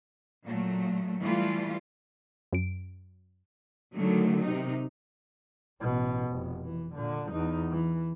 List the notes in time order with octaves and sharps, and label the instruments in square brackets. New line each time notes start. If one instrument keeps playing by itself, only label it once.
[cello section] A#2 F#3 A3
E3 G3 A3 F4
[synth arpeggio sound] F#2 D7
[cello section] D3 D#3 F#3 A3
C3 D#4
[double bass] A1 B2
F1
E3
A#2 D3
E2 D#4
E3